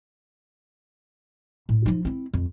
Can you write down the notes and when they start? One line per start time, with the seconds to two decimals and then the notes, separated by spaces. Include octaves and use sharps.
1.69 A2
1.86 F3 D#4
2.05 C4 E4
2.34 F2